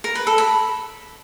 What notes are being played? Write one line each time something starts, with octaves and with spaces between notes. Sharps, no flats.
A#4
B4
A4
B5